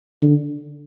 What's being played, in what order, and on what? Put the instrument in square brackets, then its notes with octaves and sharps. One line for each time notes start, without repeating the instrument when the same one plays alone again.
[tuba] D3